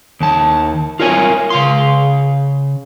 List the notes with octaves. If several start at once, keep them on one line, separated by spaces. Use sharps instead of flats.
D#2 A5
F4 A#4 C#5 G#5
C#3 F5 C6